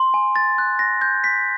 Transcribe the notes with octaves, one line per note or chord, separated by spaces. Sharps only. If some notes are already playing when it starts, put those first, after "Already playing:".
Already playing: C6
G#5
A6
F#6
A#6
G6
B6